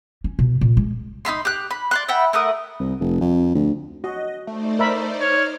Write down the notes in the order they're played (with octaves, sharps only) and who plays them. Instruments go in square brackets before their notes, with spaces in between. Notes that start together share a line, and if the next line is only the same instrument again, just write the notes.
[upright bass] C#4
B2
A#2
G#3
[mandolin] D#4 F4 B5 C6
G4 F#6
B5
D5 C6 F#6
E5 F#5 G5 B5
A3 A#4 F#5 D#6
[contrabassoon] C2
F1
F2
D2
[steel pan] F#4 [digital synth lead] D#5
[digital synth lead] A3 [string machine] D#4 C5 D5
[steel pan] A#4 E5 B5
[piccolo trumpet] C#5 [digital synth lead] F6